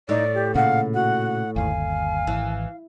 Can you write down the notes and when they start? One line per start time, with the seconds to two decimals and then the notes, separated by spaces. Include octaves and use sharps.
0.09 A2 D#4 D5
0.34 G4
0.55 A#2 C#3 F5 F#5
0.94 F#4 F#5
1.56 G1 D#2 F5 G#5
2.27 G#1 E3